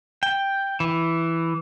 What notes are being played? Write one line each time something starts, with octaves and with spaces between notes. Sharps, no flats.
G5
E3